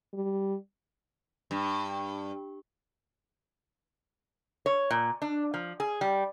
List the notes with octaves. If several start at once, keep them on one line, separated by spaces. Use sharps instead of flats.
G3
G2
C#5
A#2
D4
F3
G#4
G3